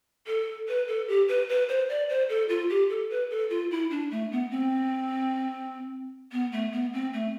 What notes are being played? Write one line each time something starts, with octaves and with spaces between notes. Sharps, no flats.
A4
B4
A4
G4
B4
B4
C5
D5
C5
A4
F4
G4
A4
B4
A4
F4
E4
D4
A3
B3
C4
B3
A3
B3
C4
A3